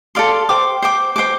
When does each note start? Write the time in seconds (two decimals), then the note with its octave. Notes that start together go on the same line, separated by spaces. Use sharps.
0.15 A4 D5 F5 C6
0.49 C5 G5 D6
0.82 C5 G5 D6
1.16 C5 G5 D6